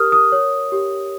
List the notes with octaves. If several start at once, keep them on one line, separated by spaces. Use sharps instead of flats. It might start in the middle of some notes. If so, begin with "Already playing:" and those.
Already playing: G4 A#4 D#6 F6
D#6
C#5
G4